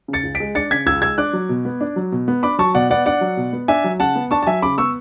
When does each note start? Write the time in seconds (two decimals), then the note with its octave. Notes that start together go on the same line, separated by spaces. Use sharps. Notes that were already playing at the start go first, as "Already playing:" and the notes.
0.08 C#3
0.13 A6 C#7
0.23 C#2
0.35 B6 D7
0.40 G#3
0.55 D4 A6 C#7
0.71 C#3 G#6 B6
0.86 C#2 E6 G#6
1.02 G#3 E6 G#6
1.18 D4 D6 F#6
1.33 F#3
1.49 B2
1.65 B3
1.81 D4
1.96 F#3
2.12 B2
2.28 B3
2.43 D4 B5 D6
2.58 F#3 A5 C#6
2.74 B2 D5 F#5
2.90 B3 D5 F#5
3.06 D4 D5 F#5
3.21 F#3
3.37 B2
3.53 B3
3.68 D4 E5 G#5
3.84 F#3
4.00 C#3 F#5 A5
4.16 B3
4.31 D4 A5 C#6
4.43 A5
4.47 F#3 E5 G#5
4.62 C#3 B5 D6
4.78 B3 C#6 E6